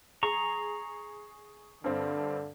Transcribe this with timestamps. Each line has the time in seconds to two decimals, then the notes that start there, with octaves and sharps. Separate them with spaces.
0.23 G#4 A#5 C#6
1.84 G2 D3 C4